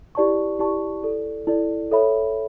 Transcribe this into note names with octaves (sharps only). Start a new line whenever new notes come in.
E4 G4 D5 A5 C#6
E4 G4 D5 A5 C#6
E4 A4 D5
E4 A4 D5
A4 C#5 E5 B5